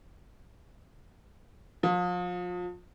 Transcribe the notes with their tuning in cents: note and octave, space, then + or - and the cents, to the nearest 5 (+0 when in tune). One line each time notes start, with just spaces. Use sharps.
F3 +35